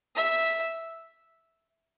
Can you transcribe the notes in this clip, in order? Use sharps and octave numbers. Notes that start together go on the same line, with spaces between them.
E5